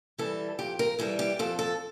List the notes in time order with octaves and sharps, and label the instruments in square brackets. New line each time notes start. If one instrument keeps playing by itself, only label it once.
[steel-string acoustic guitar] E3 G3 A4
F2 G4
A#4
E3 G3 A4
G4
F2 A4
A4